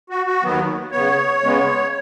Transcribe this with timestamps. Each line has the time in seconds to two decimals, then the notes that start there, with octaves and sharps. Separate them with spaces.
0.10 F#4
0.26 F#4
0.43 D#2 D#3 F#3 B3
0.92 C#3 B3 C#5
1.42 C#3 G#3 B3